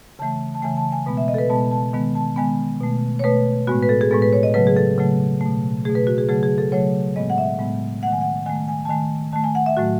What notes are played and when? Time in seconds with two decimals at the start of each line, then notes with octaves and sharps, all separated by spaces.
0.19 C#3 E3 A3 A5
0.55 A5
0.63 C#3 E3 A3 G#5
0.77 A5
0.92 G#5
1.06 B2 G#3 B3
1.17 E5
1.28 D#5
1.34 A4
1.38 B4
1.50 B2 G#3 B3 A5
1.72 A5
1.93 D#3 G#3 B3
2.15 A5
2.36 D#3 G#3 B3 G#5
2.80 B2 A3
3.19 C#5
3.24 B2 A3 B4
3.67 A2 G#3 B3 F#4
3.83 B4
3.89 A4
4.01 G#4
4.11 A2 G#3 B3 A4
4.22 B4
4.33 C#5
4.43 D#5
4.54 C#3 F#3 A3 B4
4.67 G#4
4.77 A4
4.98 C#3 F#3 A3
5.41 B2 A3
5.85 B2 A3 G#4
5.95 B4
6.07 F#4
6.18 G#4
6.29 C#3 F#3 A3 G#4
6.43 G#4
6.58 A4
6.72 C#3 F#3 A3 C#5
7.16 A2 G#3 B3 D#5
7.30 F#5
7.38 E5
7.59 A2 G#3 B3
8.03 A3 F#5
8.07 D#3
8.12 G#5
8.21 F#5
8.46 D#3 A3 G#5
8.68 G#5
8.85 A5
8.89 D#3 A3 G#5
9.33 D#3 A3 A5
9.44 G#5
9.55 F#5
9.66 E5
9.77 A2 F#3 A3 F#4